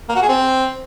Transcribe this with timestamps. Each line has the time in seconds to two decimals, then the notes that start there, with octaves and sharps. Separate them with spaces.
0.09 A#3
0.15 F#4
0.22 G#4
0.28 C4